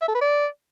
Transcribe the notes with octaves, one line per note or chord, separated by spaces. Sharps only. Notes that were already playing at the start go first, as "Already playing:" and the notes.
E5
A4
B4
D5